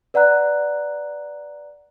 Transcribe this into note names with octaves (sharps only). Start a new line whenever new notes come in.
B4 D5 F#5 A#5 F#6